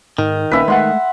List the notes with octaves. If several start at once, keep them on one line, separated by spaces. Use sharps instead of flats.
G#2 D#3
A#1 A#3 C#4 B4 E5
G#3 A3 F#5 C6